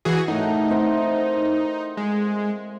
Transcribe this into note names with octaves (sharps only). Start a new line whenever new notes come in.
E3 F#4 G#4
A2 D#4 A#4 F#5
C4 A#4 E5
G#3